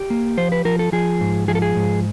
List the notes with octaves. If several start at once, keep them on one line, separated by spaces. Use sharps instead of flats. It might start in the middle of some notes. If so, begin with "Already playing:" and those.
Already playing: G4
A#3
F3 C5
B4
F3 A#4
A4
F3 G#4
G#2
F3 G#4
A4
G#4
G#2